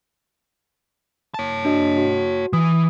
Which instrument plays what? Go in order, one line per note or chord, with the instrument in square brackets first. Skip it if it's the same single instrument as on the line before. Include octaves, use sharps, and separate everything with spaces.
[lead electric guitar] C#5 A5
[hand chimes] D4 F#4 D#5
F#4
[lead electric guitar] E3 [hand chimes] D#6